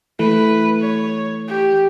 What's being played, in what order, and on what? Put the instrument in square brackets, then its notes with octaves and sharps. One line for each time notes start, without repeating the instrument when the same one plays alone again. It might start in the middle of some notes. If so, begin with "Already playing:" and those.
[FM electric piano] E3 A3 [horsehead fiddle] B4
[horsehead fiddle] C#5
G4